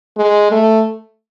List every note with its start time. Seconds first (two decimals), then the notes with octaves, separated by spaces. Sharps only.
0.17 G#3
0.52 A3